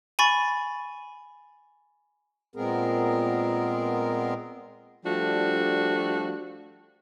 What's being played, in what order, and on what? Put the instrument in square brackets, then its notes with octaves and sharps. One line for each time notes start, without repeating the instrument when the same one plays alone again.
[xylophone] G#5 B5 C#6 A6
[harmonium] A#2 G#3 B3 C4 G#4 A#4
[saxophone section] F3 G3 A3 D4 F#4